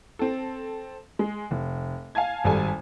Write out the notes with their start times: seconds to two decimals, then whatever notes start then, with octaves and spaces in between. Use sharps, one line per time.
0.19 C4 A4
1.19 G#3
1.51 F1
2.15 F5 G#5 A5 G#6
2.44 G#1 G3 A4 G#5